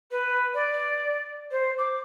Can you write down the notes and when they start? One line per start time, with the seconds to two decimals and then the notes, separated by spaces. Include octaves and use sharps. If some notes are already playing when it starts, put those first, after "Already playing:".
0.11 B4
0.54 D5
1.51 C5
1.78 D6